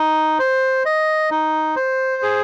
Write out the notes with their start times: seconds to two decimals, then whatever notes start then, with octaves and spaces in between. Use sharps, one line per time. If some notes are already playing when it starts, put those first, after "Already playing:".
Already playing: D#4
0.39 C5
0.86 D#5
1.31 D#4
1.76 C5
2.23 G#4